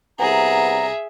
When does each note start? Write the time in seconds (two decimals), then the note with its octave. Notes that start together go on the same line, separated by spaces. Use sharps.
0.19 C2 B3 G#4 E5 A#5